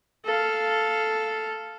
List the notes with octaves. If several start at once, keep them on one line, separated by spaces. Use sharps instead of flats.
A4 F5